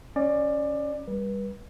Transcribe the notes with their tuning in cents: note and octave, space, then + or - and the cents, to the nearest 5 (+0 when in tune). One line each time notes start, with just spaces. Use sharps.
C#4 +0 D5 +20
G3 +20 B4 -30